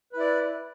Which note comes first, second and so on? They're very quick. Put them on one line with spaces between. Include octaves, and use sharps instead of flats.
B4 E4 D5